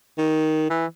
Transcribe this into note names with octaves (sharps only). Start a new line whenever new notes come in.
D#3
E3